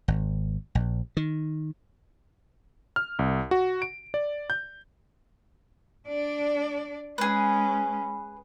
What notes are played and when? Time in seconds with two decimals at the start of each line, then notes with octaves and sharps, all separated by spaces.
0.08 G#1
0.75 A#1
1.17 D#3
2.96 F6
3.19 C2
3.51 F#4
3.82 D7
4.14 D5
4.50 G6
6.08 D4 D5
7.18 G#3 C#4 G#4 B4